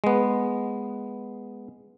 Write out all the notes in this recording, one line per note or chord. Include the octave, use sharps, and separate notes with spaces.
G#3 B3